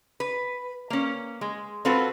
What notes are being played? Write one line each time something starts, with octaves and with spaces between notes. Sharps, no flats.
B4
A#3 C#4
G#3
C4 F4 F#4 A4 B4